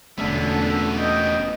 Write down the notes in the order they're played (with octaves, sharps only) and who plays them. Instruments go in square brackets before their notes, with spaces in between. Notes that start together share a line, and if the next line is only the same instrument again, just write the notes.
[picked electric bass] E1 A3 [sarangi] D3 [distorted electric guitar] B3 C#4 [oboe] E5
[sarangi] D#5 [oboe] G5